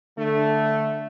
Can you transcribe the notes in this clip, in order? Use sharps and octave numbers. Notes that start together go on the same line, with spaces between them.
D3 A3